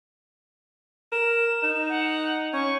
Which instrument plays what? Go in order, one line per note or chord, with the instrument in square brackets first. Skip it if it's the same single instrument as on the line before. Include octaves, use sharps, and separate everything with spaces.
[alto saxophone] A#4 [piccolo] E7
[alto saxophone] D#4
[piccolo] F#5
[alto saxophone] C#4 [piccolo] C#6